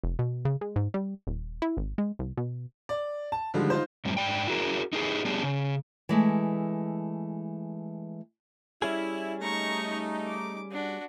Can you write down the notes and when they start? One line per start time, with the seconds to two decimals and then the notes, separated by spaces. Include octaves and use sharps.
0.04 F1
0.19 B2
0.45 C#3
0.61 G#3
0.76 G#2
0.94 G3
1.27 D#1
1.62 E4
1.77 G#1
1.98 G#3
2.19 C2
2.37 B2
2.89 D5
3.32 A5
3.54 D3 D#3 F3 G3 G#3
3.70 D#4 F4 C5
4.05 F#2 A2 G3 C4
4.17 G#2 D5 G5
4.48 E4 F#4 G#4 A#4
4.93 D#4 E4 G4 G#4 A#4 B4
5.25 G3 B3 D4 G4 G#4
5.43 C#3
6.09 E3 G#3 A3
8.82 G3 C#4 E4 G#4
9.42 A3 D#4 A#5 C#6
10.27 D6
10.72 D4 F#4